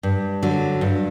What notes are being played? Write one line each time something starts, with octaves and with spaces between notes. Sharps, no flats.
G2
D3 F#3
G2